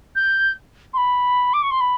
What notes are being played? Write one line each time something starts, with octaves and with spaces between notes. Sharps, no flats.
G6
C6
B5
D6
C#6
C6
B5